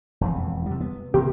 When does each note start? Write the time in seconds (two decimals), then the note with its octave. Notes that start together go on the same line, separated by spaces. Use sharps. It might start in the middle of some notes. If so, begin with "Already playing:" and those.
0.21 E1 F2 E3
0.66 C3 G3
0.81 B3
1.14 C3 E3 A#3 G4